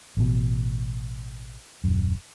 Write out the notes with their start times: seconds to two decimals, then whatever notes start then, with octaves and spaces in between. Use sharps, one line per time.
0.17 A1 B2
1.84 D#1 F#2